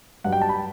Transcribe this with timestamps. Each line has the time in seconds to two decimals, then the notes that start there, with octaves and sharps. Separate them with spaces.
0.24 G2 F#3 F#5
0.32 G5
0.41 A5
0.49 B5